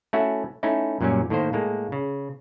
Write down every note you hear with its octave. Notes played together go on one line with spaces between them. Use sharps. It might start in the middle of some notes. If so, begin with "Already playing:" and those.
A3 C#4 E4 F#4 E5 F#5
A3 C#4 D#4 E4
F#2 A#2 F#3 G3 C#4
A2 D#3 A#3 C5
A2 G#3 A#3
C#3